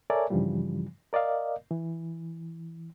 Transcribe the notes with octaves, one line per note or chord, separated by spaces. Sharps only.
A4 A#4 C#5 D5 E5 G#5
G2 C#3 E3 F3 G3
A#4 D5 D#5 F5
E3